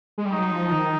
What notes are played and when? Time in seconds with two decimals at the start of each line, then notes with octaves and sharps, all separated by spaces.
0.18 G#3
0.25 G3
0.33 F#3 D#4
0.52 F3
0.72 D#3